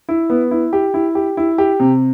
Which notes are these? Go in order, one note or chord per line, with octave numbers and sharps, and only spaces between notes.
E4
B3
E4
G4
E4
G4
E4
G4
C3